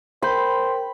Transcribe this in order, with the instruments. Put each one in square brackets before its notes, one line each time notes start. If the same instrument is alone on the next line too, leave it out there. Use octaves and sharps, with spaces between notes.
[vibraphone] A#4 G5 [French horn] C5 [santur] B5 [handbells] C6 G6